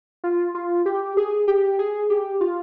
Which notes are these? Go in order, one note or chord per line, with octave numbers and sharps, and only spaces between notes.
F4
F4
G4
G#4
G4
G#4
G4
F4